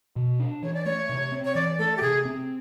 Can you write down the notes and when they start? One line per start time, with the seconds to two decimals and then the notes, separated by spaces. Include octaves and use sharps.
0.16 B2
0.39 D4
0.63 E3 C#5
0.74 D5
0.85 A3 C#5
1.09 C3
1.32 C4
1.45 C#5
1.55 E3 D5
1.78 A3 A4
1.97 G4
2.02 C3 G#4
2.25 C4